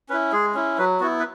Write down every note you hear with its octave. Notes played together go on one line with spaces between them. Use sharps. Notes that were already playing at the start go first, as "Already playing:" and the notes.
C#4 E4 B4
G#3 G#4
C#4 E4
F#3 B4
B3 E4 F#4
B4